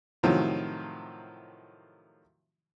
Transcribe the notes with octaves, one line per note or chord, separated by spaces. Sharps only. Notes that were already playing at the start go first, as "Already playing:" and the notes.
A2 C3 D#3 F3 F#3